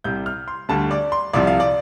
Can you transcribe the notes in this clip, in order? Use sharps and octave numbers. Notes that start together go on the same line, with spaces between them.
C2 C3 G3 G6
F6
C6
D2 D3 G3 A5
D5
C6
C2 C3 F3 D5
F5
D5